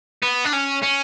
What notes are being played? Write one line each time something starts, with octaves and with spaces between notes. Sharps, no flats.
B3
D4
C#4
C#4